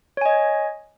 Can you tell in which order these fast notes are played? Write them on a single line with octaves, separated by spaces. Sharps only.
C#5 G#5 D#5